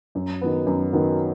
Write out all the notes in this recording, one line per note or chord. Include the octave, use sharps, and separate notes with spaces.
F#2
D#3 F#3 B3
F#2
D#3 F#3 B3